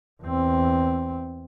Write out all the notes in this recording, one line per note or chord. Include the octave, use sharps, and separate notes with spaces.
E2 C4